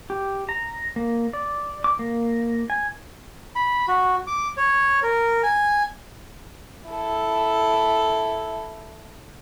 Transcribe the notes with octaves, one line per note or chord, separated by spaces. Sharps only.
G4
A#5
A#3
D5
D6
A#3
G#5
B5
F#4
D6
C#5
A#4
G#5
E4 A4